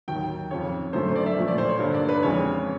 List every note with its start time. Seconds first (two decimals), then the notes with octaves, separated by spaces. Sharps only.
0.08 D#2 D#3 F#3 G5
0.51 F2 C#3 F3 C#5
0.93 F#2 D3 F#3 A3 C5
1.05 C5
1.16 D5
1.26 E5
1.37 A#2 F3 A3
1.48 D5
1.58 C5
1.69 C#5
1.79 G2 D3 G3 A#3
1.94 D5
2.09 B4
2.23 F2 C#3 E3 G#3 C#5